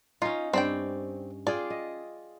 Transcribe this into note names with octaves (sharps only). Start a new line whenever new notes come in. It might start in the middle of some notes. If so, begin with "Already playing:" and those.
C#4 D#4 F4
G2 C4 D5 G5
F4 G#4 D5 G5
D#5